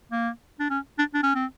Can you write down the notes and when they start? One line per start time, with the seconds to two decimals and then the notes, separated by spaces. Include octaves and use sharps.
0.12 A#3
0.60 D4
0.70 C#4
0.99 D4
1.14 D4
1.23 C#4
1.35 C4